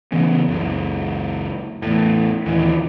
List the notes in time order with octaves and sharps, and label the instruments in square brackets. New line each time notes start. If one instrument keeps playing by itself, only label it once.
[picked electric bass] C#3 E3 B3 C#4
F#1 C#2
E2 A2
D#2 A#2 E3